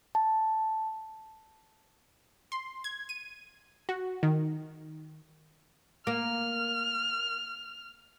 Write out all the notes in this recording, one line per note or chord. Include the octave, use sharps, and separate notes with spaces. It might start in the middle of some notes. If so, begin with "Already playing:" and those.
A5
C6
G#6
D#7
F#4
D#3
A#3 F6